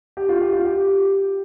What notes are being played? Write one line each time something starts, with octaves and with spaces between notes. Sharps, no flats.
G4
F4
G4
F4
G4